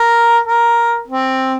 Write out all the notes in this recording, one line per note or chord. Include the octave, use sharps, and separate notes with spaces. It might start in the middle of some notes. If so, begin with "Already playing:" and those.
Already playing: A#4
A#4
C4